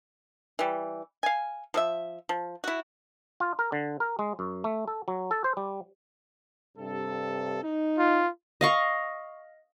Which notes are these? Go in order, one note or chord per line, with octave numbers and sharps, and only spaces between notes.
E3 G3
F5 G#5
F3 A4 E5
F3
E4 F#4
F4
A#4
D3
A#4
G#3
F#2
A3
A4
F#3
A4
C5
G3
G2 C3 A4
D#4
F4
D#5 F5 C#6